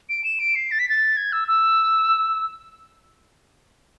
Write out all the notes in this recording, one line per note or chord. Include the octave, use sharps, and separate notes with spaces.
D7
E7
D7
C7
A6
B6
A6
G#6
E6
E6